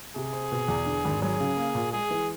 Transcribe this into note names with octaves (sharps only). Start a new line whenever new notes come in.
C3 G#4
C4
B2
E2
D3
G#1
F#3 G#4
C#3
A#3
A#2
G#3 G#4
E3